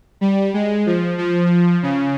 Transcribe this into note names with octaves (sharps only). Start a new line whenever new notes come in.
G3
G#3
F3
F3
C#3